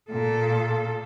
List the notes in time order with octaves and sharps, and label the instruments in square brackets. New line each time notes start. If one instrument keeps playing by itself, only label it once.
[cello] A#2 A4